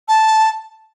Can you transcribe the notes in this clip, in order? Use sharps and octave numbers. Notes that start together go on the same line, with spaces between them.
A5